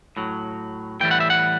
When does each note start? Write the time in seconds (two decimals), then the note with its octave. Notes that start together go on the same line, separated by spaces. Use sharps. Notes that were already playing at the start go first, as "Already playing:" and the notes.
0.17 A2 F#3
1.00 A2 E3 G3 G5
1.11 F#5
1.20 E5
1.30 F#5